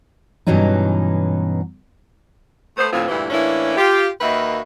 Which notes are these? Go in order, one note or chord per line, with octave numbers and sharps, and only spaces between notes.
G2 B2 E3 F#3 C#4 D#4
A3 B3 C5
D2 A2 F3 B3 C4 F4
D2 G2 A#2 E3 E4
A2 E3 A#3 C#4 D4 E4
F4 G4
D#2 A#3 F#4 B4 D#5 E5